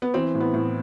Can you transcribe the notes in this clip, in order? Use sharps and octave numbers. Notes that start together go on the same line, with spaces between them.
B3
E3 C4
A2
B3
A2